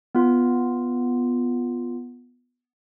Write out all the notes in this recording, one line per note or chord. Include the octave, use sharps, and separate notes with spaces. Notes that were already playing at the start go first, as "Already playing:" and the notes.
B3 F4